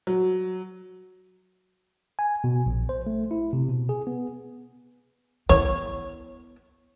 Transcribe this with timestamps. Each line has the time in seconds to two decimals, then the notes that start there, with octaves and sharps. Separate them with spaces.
0.07 F#3
2.19 G#5
2.44 B2
2.66 A#1
2.89 C5
3.07 A3
3.31 E4
3.53 C3
3.69 B2
3.89 G#4
4.07 B3
5.49 B3 E4 C#5